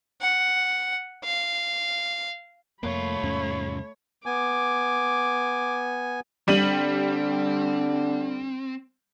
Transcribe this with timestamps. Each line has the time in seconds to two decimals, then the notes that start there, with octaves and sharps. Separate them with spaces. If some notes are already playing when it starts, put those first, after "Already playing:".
0.21 F#5
1.24 F5
2.83 C2 F2 A3 A#3 F4 C#5 B5
3.23 E2 G#2 C#4
4.26 B3 G#5 D6
6.48 D3 G3 C4 D#7 F#7